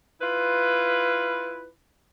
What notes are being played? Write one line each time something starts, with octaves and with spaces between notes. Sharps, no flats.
E4 F4 B4